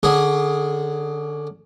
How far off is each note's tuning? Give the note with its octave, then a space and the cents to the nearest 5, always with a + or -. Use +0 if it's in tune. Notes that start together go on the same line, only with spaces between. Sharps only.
D3 +15 C#4 +35 G#4 +0